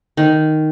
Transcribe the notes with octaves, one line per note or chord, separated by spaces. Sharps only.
D#3